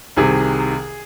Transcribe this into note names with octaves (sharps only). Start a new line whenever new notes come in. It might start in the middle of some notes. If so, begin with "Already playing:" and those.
C2 C3 D#3 G#4